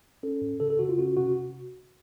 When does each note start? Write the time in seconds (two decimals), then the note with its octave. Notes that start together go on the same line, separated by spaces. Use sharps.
0.23 C#4 A4
0.42 A2
0.60 C#3 A4
0.70 A4
0.79 C#3 F#4
0.89 F4
0.98 C#4 F#4
1.17 C3 F#4